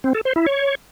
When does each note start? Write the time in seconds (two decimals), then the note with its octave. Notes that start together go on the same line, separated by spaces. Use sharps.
0.04 C4
0.15 A4
0.25 C5
0.36 E4
0.46 C#5